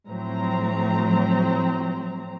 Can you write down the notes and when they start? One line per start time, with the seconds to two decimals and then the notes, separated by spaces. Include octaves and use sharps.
0.10 A2 F3 F#3 C4 A#5